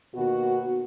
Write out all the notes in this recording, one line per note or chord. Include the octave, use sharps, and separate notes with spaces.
D#2 B2 F#4